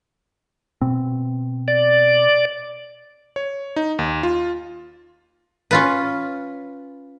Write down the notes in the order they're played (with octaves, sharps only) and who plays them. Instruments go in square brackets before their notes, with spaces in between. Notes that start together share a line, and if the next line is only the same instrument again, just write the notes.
[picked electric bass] B2 C4
[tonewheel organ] D5
[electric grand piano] C#5
D#4
D#2
F4
[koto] C#4 F4 B4